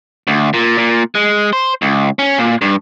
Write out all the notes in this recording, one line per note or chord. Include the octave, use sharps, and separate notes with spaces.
D2
A#2
A#2
G#3
C5
C#2
C#4
A#2
G2